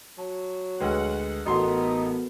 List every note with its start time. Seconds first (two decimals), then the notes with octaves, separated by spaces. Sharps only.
0.18 F#3 A5
0.80 D2 G#3 B4 F#5 G5 F6
1.46 A1 A3 B3 D#4 F#4 A#4 F#5 C6